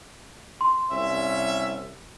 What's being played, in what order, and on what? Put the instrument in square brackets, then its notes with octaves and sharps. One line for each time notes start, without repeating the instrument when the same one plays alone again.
[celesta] C6
[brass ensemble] C2 C#4 E5